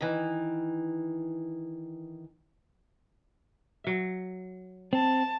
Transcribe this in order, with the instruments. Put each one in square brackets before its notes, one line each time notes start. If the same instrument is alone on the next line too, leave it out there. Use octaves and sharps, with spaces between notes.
[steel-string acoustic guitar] D#3 E3
[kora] F#3 E5
[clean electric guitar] C4 [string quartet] A5